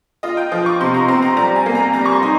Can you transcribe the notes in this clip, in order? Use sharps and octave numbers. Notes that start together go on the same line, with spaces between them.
F4 D#5
G5
F3
C#6
C3 C6
A#5
C4 C6
A#5
G3 A#5
G#5
A#3
A#5
G3 A#5
C#6
C6
D#4